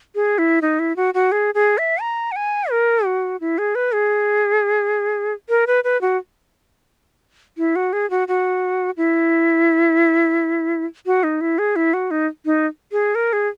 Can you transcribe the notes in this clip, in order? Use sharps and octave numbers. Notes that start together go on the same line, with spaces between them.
G#4
E4
D#4
E4
F#4
F#4
G#4
G#4
E5
A#5
F#5
G#5
A#4
F#4
E4
G#4
B4
G#4
A#4
B4
B4
F#4
E4
F#4
G#4
F#4
F#4
E4
F#4
D#4
E4
G#4
E4
F#4
D#4
D#4
G#4
A#4
G#4